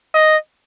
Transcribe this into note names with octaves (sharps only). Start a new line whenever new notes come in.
D#5